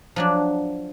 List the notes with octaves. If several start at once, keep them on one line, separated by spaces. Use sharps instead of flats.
F3 F#3 D4